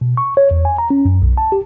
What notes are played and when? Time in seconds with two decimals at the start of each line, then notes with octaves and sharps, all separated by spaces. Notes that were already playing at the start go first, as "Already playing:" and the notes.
0.01 B2
0.17 C#6
0.37 C#5
0.51 E2
0.65 G#5
0.78 A#5
0.90 C#4
1.05 F#2
1.22 B1
1.38 A5
1.52 G4